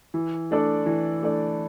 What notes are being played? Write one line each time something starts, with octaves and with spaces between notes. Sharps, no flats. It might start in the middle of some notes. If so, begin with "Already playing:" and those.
E3
A3 D4 A4 D5
E3
A3 D4 A4 D5